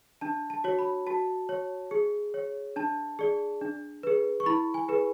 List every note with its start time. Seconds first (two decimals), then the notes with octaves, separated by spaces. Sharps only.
0.21 D4 A5
0.50 A5
0.64 F#4 C#5
0.79 B5
1.07 F#4 A5
1.49 C#5
1.91 G#4
2.34 C#5
2.76 D4 A5
3.19 G#4 D5
3.61 D4
4.03 G#4 B4
4.40 C#6
4.46 E4 B5
4.74 G#5
4.88 G#4 B4